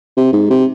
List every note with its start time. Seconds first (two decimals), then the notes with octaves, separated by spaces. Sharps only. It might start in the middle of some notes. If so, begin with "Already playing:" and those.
0.17 C3
0.33 G#2
0.50 C3